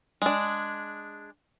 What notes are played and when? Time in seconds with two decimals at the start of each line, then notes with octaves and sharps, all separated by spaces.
0.22 G#3 D4